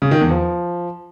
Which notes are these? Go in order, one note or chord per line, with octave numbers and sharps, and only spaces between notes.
C#3
D#3
E2
F3